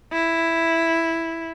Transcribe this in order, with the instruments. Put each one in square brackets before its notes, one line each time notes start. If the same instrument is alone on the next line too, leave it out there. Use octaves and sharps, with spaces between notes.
[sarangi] E4